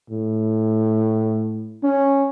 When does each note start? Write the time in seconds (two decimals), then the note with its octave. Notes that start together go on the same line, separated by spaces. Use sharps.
0.10 A2
1.83 C#4